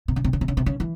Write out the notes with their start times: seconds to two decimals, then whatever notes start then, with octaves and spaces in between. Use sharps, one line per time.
0.08 C3
0.16 C#3
0.24 C3
0.33 C#3
0.41 C3
0.48 C#3
0.57 C3
0.66 C#3
0.80 E3